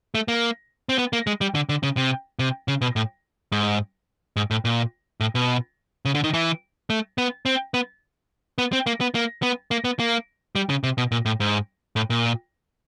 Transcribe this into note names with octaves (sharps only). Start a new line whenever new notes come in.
A3
A#3
C4
B3
A#3
G#3
G3
D3
D3
C#3
C3
C3
C#3
B2
A2
G#2
G#2
A2
A#2
A2
B2
C#3
D3
D#3
E3
A3
B3
C4
B3
B3
C4
A#3
B3
A#3
B3
A#3
B3
A#3
G3
C#3
C3
B2
A#2
A2
G#2
A2
A#2